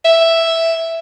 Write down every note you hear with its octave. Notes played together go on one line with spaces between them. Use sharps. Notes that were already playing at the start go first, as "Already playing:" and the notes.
E5